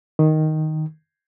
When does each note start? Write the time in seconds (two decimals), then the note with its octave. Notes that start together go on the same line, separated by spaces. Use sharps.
0.19 D#3